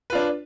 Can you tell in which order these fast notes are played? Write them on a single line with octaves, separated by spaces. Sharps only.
B4 F4 D4